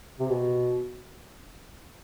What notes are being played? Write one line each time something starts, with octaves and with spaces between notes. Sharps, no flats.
C3
B2